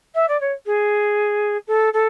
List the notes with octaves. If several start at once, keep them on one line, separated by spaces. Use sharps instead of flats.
E5
D5
C#5
G#4
A4
A4